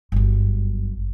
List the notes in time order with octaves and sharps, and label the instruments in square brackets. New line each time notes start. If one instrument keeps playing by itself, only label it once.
[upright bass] G1 F#2